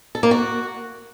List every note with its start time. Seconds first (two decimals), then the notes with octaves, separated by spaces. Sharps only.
0.15 A4
0.23 A#3
0.31 F#4